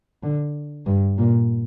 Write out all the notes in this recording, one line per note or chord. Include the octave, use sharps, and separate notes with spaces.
D3
G2
A#2